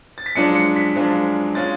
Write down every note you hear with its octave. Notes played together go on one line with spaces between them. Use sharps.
A6
B6
F#2 F3 G#3 D4 F4 C#7
C#7
B6
F#2 F3 G#3 D4 F4
G#3 C#4 F4 A6